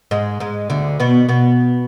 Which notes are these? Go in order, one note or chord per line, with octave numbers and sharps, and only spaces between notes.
G#2 G#3
G#2 G#3
D2 D3
B2 B3
B2 B3